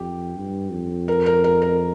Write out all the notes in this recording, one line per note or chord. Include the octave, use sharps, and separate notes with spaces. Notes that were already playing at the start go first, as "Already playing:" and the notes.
Already playing: F2 G4
G2
F2
A#4
A#4
A#4
A#4